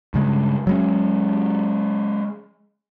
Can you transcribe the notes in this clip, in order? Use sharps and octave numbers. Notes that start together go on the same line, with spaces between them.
G2 C#3 G#3
F#3 G#3 C#4